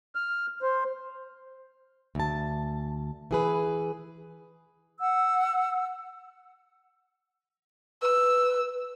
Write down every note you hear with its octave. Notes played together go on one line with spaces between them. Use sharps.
F6
C5
D2 A5
E3 G#4 B4
F#5 E6
B4 E6